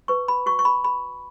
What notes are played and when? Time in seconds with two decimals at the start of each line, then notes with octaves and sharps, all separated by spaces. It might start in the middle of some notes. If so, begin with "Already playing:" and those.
0.08 B4 C#6
0.28 B5
0.46 F#4 C#6
0.59 C#6
0.65 B5
0.84 B5